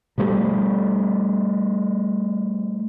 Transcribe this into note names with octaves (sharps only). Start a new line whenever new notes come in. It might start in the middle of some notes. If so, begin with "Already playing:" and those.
B2 F3 G3 A3